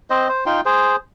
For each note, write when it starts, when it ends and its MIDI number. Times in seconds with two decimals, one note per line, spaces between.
0.10 0.28 60
0.10 0.28 72
0.10 0.28 75
0.29 0.44 72
0.46 0.61 63
0.46 0.61 65
0.46 0.61 79
0.46 0.61 84
0.65 0.96 68
0.65 0.96 72